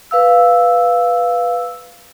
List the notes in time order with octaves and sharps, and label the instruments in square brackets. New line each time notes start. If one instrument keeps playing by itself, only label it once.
[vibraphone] B4 F5 E6